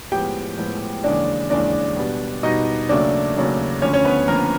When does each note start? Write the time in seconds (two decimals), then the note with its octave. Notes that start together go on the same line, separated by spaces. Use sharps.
0.12 A2 F3 G#3 B3 G4 G5
0.58 A2 F3 G#3 B3
1.04 D#2 C#3 E3 G#3 D4 D5
1.50 D#2 C#3 E3 G#3 D4 D5
1.97 B2 G3 B3
2.43 B2 G3 B3 D#4 D#5
2.89 D#2 C#3 F#3 A3 D4 D5
3.36 D#2 C#3 F#3 A3
3.82 D2 D3 F3 C#4 C#5
3.93 C#4 C#5
4.05 B3 B4
4.28 D2 D3 F3 A#3 A#4